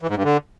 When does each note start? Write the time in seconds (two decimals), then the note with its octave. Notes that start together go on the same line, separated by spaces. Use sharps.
0.02 E3
0.09 G#2
0.16 G2
0.24 D3